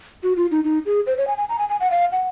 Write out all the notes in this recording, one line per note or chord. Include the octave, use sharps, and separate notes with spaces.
F#4
F4
D#4
D#4
G#4
C5
C#5
G#5
G#5
A#5
G#5
G#5
F#5
F5
F#5